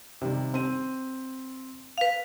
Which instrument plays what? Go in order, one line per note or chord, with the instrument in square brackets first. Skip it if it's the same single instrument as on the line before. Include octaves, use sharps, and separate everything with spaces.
[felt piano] C3 D#3 G3
C4 D#7
[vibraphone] B4 F5